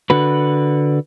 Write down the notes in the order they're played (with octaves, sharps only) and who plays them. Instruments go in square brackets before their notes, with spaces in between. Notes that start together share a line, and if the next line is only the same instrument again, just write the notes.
[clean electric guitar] D3 F#4 B4